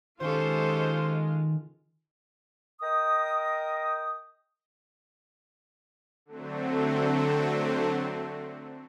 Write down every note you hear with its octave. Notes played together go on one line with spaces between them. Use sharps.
D#3 G#3 C#4 F4 G4 A4 C5
A#4 D#5 G5 D#6
D3 F#3 A3 C4